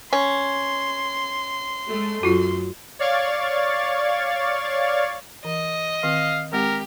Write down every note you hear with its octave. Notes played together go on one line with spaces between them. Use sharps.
C#4 C6
G#3 A3
F#2 F4 F#4
C#5 D5 F5 C#6 G#6 A6
E3 D#5
D#3 C4 F5
G#3 C4 G4 A#4 F#5